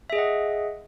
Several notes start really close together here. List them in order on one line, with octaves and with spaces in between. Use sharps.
E5 G#4 D#5 F#5